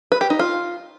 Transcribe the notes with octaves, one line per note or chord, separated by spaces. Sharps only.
B4
G4
D#4
F4